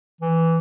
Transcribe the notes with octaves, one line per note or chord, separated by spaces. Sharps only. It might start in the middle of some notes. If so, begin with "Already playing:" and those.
E3